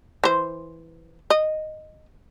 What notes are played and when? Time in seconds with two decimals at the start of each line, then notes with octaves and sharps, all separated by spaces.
0.24 E3 C5
1.30 D#5